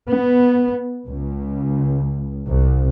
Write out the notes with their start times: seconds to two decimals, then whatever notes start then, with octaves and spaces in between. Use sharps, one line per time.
0.10 B3
1.06 C#2
2.47 C2